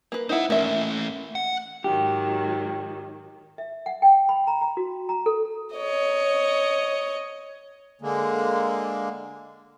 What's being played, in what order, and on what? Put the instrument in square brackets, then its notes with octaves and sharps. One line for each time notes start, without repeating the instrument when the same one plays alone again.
[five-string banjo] A#3 B4
[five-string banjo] D#4 E4 [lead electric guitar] C5 F#5
[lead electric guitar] A3 C#4 [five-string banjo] A#3 E5
[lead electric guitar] F#5
[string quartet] G#2 D#3 F#3 [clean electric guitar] G4
[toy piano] E5
F#5
G5
B5
A#5
A#5
F#4
A#5
A4
[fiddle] C#5 D#5
[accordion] D3 G#3 A#3